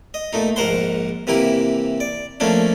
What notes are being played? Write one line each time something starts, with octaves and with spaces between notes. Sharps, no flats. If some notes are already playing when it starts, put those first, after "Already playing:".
D#5
A#2 A3 D#4
A#1 G#2 A#4 C5 F#5 C6
C3 E3 A#3 E4 G4
D5
F3 A3 A#3 C#4 D4